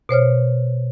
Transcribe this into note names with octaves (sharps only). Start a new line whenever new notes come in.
B2 C5 C#5 F6